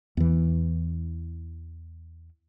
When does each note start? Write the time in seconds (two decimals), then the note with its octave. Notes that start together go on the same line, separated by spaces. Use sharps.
0.17 E2 E3